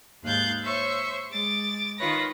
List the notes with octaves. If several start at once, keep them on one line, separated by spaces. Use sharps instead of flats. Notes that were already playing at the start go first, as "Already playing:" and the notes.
D#2 G#2 F5 F#6 G6 A6
C5 C#5 E5 C#6 G6
G#3 D6 A6
D#3 F4 B4 C#5 A#6